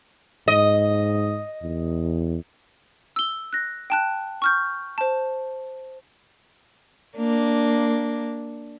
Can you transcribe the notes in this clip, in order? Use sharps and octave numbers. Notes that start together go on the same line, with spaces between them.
G#2 D#5
E2
E6 G7
F#6 A#6
G5 A5 F#6
C#6 F6 G6
C5 A5
A#3 D4